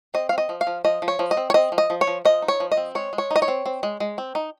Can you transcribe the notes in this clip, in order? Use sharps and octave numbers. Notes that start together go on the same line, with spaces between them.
C4 D#5
C4 F5
D#5
F3
F5
F3
F3 D#5
F3
C#5
F3
D#5
C4
C#5
C4 D#5
F3
D#5
F3
C#5
F3
F3 D#5
D#4
C#5
F3
D#5
C4
G#3 C#5
G#3
C#5
D#4
D#5
C#5
C4
C4
G#3
G#3
C4
D#4